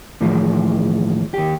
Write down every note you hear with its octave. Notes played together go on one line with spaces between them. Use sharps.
D#2 A2 E3 F3 G#3
D#2 G4